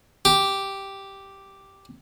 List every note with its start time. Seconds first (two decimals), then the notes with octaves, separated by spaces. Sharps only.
0.25 G4